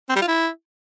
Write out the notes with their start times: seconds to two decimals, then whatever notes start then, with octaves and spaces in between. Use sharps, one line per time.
0.09 C4
0.15 G3
0.22 F4
0.28 E4